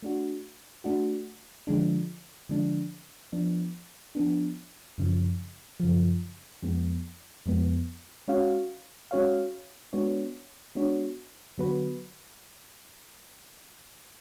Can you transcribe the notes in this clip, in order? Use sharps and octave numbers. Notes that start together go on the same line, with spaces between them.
A3 D4 F#4
A3 D4 F#4
D3 F3 G#3 D4
D3 F3 G#3 D4
F3 B3 D4
F3 B3 D4
F#2 C#3 F3
F#2 C#3 F3
F2 F3 G#3 B3
F2 F3 G#3 B3
G#3 C#4 F#4 C#5 F5
G#3 C#4 F#4 C#5 F5
G#3 B3 D4 F#4 C#5
G#3 B3 D4 F#4 C#5
D3 F#3 B3 F#4 B4